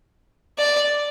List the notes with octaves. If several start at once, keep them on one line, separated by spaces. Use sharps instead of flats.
D5